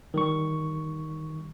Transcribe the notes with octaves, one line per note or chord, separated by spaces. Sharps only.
D#3 G3 C#6